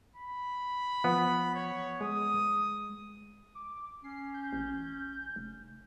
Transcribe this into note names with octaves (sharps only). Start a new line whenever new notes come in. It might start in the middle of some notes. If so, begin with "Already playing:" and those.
B5
F3 B3
C#5
G#3 D#6
D6
C#4 C7
G6
A1
F1